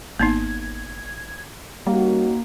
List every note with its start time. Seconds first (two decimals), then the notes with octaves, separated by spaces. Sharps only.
0.20 G#1 A#3 B3 D#4 G#6
1.87 G3 A#3 C#4 D#4 F#4